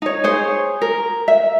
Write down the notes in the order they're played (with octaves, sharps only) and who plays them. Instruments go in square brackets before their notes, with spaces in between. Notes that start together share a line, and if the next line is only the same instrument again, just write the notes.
[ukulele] D#4 C#5
G#4 C5 C#5
A#4
E5